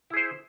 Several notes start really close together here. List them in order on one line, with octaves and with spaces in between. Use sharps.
E4 G#4 C5